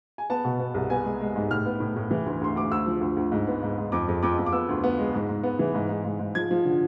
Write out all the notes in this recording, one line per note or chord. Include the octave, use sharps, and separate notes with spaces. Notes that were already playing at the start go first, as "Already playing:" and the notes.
G#5
B3 A5
B2
B3
C2
B3 G#5
G#3
G#3
G#2
A2 F6
B3
A2
A2
E3
D2
D2 C6
D2 D6
D2 E6
F3
D2
D2
G#2
B3
G#2
G#2
F2 D6
F2
F2 D6
F2
D6
B3 E6
D2
B3
G#3
G#2
G#2
B3
E3
G#2
G#2
G#2
G#2
F3 G#6
F3
D3